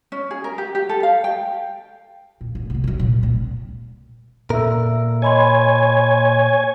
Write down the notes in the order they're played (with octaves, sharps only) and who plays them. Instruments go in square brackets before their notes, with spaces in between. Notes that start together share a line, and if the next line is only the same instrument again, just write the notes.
[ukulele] C#4
G#4
A#4
G4
G4
A4
F5
G5
[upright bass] A#2
A1
C3 A#3
D#3 F#3
A#2
A#2 C4
[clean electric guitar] A#2 A#4 [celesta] A4 E5 E6
[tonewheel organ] C#5 G#5 [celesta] D#5 B5 C6